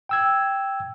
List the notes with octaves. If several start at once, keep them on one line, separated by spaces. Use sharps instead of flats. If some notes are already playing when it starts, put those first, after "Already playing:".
G5 E6 G#6